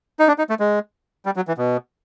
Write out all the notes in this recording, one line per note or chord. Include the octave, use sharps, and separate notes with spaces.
D#4
D4
D#4
A3
G#3
G3
F#3
E3
B2